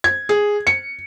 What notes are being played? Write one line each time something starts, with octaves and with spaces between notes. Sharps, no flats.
G#6
G#4
C#7